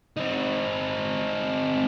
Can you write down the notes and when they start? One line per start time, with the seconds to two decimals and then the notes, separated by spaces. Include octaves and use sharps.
0.17 C4 D#4